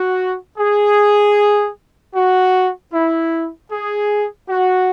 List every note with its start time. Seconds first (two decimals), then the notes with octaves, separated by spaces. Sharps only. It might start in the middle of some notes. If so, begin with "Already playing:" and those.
Already playing: F#4
0.58 G#4
2.15 F#4
2.93 E4
3.70 G#4
4.48 F#4